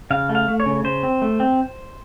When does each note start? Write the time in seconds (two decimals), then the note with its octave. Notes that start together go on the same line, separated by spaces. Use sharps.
0.11 C#3 F5
0.29 A3
0.35 F5
0.48 A3
0.60 C#5
0.66 C#3
0.84 C#3 C5
1.03 C4
1.22 A3
1.40 C4